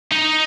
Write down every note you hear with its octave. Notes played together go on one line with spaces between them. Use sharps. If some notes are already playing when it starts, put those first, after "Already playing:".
D#4